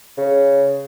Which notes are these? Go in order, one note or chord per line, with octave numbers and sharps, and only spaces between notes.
C#3